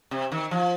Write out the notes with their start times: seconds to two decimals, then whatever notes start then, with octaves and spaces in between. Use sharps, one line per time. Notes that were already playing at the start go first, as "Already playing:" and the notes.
0.11 C3
0.32 D#3
0.51 F3